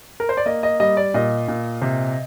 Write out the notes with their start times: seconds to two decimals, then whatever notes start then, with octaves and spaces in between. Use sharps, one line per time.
0.20 A#4
0.29 C5
0.37 D5
0.46 A#3 D#5
0.63 D#5
0.80 G3 D#5
0.97 D5
1.14 A#2 D#5
1.48 A#2
1.82 C3